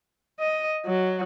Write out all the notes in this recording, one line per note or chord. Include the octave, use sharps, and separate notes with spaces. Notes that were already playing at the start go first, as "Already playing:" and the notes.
D#5
F#3